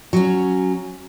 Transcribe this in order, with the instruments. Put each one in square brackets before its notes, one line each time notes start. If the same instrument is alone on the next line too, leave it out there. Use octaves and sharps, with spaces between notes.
[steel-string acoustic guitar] F#3 C#4